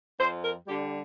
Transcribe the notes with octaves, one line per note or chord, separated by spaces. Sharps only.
F2 C5
A#4
D3 G3 G4